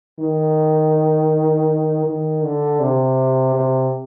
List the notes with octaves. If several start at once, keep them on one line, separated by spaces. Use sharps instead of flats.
D#3
D#3
D3
C3
C3